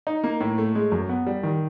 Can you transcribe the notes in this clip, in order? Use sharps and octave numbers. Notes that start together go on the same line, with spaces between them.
D#4
A#3
A2
A3
G#3
F#2
B3
G3
D#3